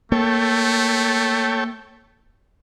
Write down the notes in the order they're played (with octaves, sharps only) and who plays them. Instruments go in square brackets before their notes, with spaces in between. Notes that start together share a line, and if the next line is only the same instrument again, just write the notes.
[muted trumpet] A3 [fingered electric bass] A#3 [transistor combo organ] A4 C#5 G5